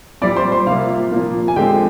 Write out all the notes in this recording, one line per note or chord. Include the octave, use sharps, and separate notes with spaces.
A#2 G3 C4 D5 D6
C5 C6
C5 C6
C3 G3 A#3 F4 F5
A#2 F3 A#3
G#5
D3 F3 G#3 C4 G4 G5